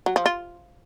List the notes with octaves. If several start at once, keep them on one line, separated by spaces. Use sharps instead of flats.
F#3
F3
F4